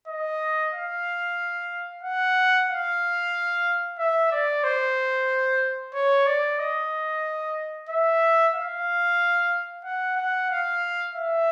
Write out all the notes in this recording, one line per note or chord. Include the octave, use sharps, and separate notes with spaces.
D#5
F5
F#5
F5
E5
D5
C5
C#5
D5
D#5
E5
F5
F#5
F#5
F5
E5